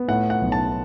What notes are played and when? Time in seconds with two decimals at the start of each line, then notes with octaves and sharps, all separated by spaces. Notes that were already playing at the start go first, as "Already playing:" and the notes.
Already playing: B3
0.08 A2 F#5
0.30 F#5
0.41 B1
0.52 A5